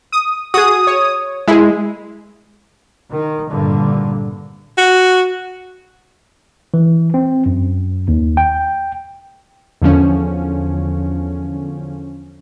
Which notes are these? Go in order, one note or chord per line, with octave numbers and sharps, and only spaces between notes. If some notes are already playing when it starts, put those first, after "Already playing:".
D#6
F#4 G#4 D#6
C#5
G#3 E4 G#4
D#3
G#1 G2 A#2 D3
F#4
E3
C4
F#2
D#2
G5
E2 D3 F3 C#4